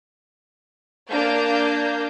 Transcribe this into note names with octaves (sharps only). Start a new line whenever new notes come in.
A#3 D4 F5 G6